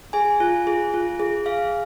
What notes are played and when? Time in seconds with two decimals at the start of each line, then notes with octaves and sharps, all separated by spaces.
0.13 G#4 G#5
0.40 F4
0.67 G#4
0.94 F4
1.20 G#4
1.46 G#4 F5